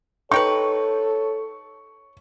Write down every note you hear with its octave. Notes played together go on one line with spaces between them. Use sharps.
D#4 G4 A4 B4 C#5 C#6